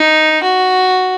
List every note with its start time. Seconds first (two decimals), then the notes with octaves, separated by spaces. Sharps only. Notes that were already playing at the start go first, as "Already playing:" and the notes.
Already playing: D#4
0.43 F#4